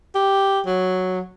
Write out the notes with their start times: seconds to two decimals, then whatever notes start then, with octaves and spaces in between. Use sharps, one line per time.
0.15 G4
0.66 F#3